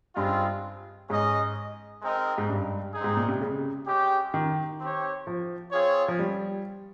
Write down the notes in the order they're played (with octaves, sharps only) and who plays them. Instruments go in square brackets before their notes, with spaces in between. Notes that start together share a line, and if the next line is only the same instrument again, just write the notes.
[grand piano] G2 [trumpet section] G#3 C4 F4
[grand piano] G#2 [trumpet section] C#4 G#4 D#5
[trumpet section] G#3 C4 D#4 A#4 D#5
[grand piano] G#2
G2
[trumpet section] C4 D#4 G#4
[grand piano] G#2
A#2
C3
C#3
[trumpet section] G#3 C#4 G4
[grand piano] D#3
[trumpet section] C4 G4 C#5
[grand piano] F3
[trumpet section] C4 F4 G#4 C#5
[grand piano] F3
G3